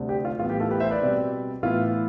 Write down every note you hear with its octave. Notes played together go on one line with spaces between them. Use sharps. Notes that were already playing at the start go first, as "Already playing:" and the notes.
Already playing: D2 C3 G3 D4
G4
F4
A2 E3 G3 B3 F4
G4
F4 A4
G4 B4
C5 E5
B4 D5
B2 G3 C4
A2 E3 B3 E4 F4